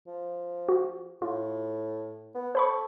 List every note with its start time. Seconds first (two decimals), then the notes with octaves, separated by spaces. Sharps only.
0.07 F3
0.69 F#4
1.22 A2 F4
2.35 B3
2.55 A4 C5 B5 C#6